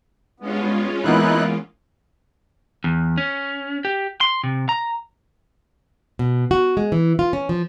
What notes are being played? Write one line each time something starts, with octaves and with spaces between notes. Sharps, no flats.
G2 G#3 B3 C#4 F4
E3 A#3 B3 D#4 E4 F#6
E2
C#4
G4
C6
C3
A#5
B2
F#4
G#3
E3
F4
C#4
F3